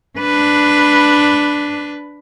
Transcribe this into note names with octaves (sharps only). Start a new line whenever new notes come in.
D4 B4